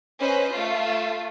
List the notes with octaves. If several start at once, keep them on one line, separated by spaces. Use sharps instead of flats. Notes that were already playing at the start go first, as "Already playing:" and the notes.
C#4 B4 C5 D#5
A3 F4